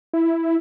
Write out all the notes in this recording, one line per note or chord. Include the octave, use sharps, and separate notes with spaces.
E4